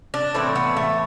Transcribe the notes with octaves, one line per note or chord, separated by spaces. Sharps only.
D4
A2 E3 A3 C4
B3
A3